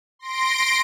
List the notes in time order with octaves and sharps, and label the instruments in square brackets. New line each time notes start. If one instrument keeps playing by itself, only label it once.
[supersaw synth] C6 A#6 D7